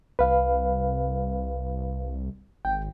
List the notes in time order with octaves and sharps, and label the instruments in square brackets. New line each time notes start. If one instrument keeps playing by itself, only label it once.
[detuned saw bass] C2 [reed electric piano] B4 F5
[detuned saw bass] G#1 [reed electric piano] G5